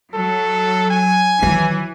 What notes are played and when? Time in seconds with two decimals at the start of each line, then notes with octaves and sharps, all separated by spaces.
0.14 F#3 A4
0.90 G#5
1.43 D#3 E3 F#3